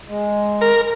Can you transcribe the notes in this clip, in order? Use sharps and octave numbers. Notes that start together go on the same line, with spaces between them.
G#3
A#4